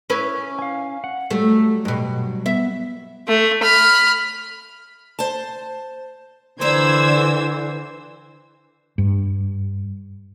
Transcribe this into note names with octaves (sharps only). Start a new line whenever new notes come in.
C#4 E4 B4
F5 G#5
F#5
F#3 G3 A3 G4
G2 B2
B3 E5
A3
B5 F6
C5 A5
F2 D3 E3 C5 D5 A#5 E6 G#6
G2